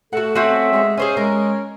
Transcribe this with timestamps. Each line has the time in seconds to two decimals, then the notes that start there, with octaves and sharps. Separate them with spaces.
0.13 A3 F#4 A4 F#5
0.35 C4 C#4 F#4 E5
0.72 G#3
0.97 C#4 G#4 C5 D#5
1.17 G#3 A#4